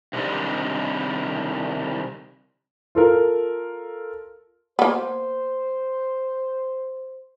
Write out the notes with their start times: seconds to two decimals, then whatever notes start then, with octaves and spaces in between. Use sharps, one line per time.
0.13 C3 D#3 G3 C4 D4
2.95 F4 A4 A#4
4.79 A#3 B3 C5